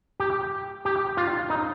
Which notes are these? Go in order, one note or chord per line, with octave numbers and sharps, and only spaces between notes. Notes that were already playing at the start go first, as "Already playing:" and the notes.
G4
G4
F4
D#4